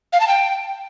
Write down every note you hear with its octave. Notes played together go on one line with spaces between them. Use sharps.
F5
A5
G5